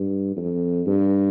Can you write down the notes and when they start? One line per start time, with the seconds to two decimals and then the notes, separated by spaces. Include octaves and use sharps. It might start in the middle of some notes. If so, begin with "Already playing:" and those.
Already playing: G2
0.37 F2
0.87 G2